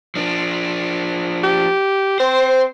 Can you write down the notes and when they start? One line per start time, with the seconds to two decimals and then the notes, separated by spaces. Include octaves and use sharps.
0.16 F3 D4
1.43 G4
2.20 C4 C5